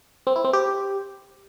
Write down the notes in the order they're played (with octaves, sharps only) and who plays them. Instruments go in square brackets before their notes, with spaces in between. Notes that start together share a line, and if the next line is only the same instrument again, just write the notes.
[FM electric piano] C4
E4
C4
G4